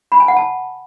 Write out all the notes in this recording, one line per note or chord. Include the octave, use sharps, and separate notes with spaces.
B5
G#5
F#5
A5